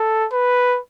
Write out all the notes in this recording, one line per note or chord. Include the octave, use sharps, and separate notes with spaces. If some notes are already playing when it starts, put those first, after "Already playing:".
Already playing: A4
B4